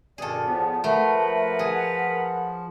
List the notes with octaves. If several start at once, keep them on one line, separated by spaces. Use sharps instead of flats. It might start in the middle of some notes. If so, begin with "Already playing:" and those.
G2 B2 D#3 G#4 A4 D5
E2 A2 F3 B3
A3 A#4 B4 F#5 B5
G#4